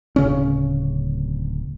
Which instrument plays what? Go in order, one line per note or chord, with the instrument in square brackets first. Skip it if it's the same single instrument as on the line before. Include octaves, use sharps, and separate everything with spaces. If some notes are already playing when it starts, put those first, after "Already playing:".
[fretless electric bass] D1 C#3 C#4